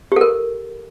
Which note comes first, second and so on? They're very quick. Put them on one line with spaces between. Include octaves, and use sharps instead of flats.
G4 A4 A#4